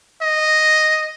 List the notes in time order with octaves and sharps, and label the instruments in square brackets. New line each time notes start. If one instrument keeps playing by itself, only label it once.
[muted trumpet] D#5